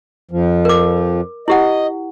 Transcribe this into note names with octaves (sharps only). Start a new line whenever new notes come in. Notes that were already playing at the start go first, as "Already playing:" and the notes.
F2 F3
A#4 D6
E4 G4 D#5 F#5